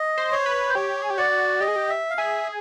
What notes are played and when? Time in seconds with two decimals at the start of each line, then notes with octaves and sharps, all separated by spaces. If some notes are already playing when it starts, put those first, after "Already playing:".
Already playing: D#5
0.18 C5
0.32 C#5
0.46 B4
0.69 C5
0.75 G4 C#5
1.02 G#4
1.10 G4
1.18 F#4 D5
1.60 G4 D#5
1.68 G#4
1.76 G4
1.90 E5
2.10 F5
2.18 G#4 E5